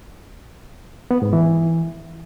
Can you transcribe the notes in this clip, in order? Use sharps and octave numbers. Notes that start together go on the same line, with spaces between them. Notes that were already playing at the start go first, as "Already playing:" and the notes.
B3
G#2
E3